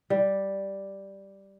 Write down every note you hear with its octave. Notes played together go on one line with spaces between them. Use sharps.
G3